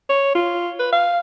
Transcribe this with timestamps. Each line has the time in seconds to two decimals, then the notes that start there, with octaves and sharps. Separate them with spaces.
0.09 C#5
0.35 F4
0.79 B4
0.93 F5